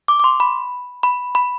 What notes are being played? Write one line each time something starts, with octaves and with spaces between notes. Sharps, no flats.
D6
D6
C6
B5
B5
B5